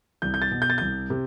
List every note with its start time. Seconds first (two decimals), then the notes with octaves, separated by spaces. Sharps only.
0.22 C2 G6
0.34 G6
0.42 A6
0.51 B2
0.62 G6
0.70 A6
0.78 C2 G6
1.10 C3